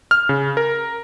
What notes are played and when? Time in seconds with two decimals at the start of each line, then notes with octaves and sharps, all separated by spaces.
0.11 F6
0.29 C#3
0.57 A#4